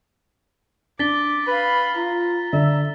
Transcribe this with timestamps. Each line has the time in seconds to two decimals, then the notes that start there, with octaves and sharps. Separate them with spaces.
0.99 D4 D6 A6 B6 G7
1.47 B4 F5 B5
1.96 F4 A#5
2.53 D3 E5